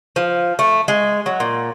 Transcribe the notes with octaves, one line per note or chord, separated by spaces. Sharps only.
F3
A3
G#3
F#3
A#2